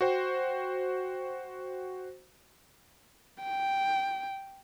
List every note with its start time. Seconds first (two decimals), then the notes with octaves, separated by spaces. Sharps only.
0.01 F#4 C5 G5
3.43 G5